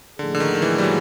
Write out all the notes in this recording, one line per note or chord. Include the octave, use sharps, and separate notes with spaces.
A2 D3 F3 A#3 D#4 G#4
D3
D#3
D#3
E3
G3
F#3